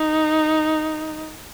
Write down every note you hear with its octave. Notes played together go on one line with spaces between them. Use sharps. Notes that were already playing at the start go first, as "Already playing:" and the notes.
Already playing: D#4